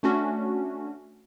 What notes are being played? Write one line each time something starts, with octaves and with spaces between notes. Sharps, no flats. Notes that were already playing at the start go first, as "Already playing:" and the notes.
A3 C#4 D4 F#4